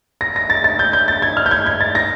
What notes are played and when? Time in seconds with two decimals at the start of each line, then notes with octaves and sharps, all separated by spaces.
0.21 A#6
0.36 A#6
0.50 A6
0.64 A6
0.79 G6
0.93 G6
1.08 A6
1.22 G#6
1.37 F6
1.46 G6
1.51 G#6
1.66 G#6
1.81 A6
1.95 A#6